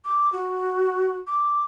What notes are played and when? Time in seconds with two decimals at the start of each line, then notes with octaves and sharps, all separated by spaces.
0.05 D6
0.33 F#4
1.27 D6